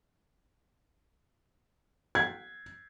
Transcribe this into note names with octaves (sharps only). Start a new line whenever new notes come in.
G#6